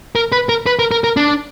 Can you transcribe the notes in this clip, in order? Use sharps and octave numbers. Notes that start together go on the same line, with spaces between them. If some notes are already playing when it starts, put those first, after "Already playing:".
A#4
B4
A#4
B4
A#4
A#4
A#4
D4